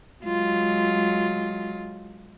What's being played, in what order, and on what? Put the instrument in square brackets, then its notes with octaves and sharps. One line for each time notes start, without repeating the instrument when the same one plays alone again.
[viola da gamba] F#3 G#3 F4